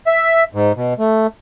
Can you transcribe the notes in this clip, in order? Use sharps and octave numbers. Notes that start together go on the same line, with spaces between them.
E5
G#2
B2
A3